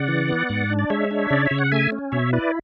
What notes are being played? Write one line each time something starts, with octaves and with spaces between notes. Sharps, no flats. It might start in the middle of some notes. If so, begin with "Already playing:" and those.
Already playing: C#3 D5 F#5
E3
B3
G#2
D4
D5
G#3 C#5 E5
D4
C#3 D5
E5
C#3
F#5
A3 E5 G#5
C#4
B2 C#5 E5
E4 B4 D5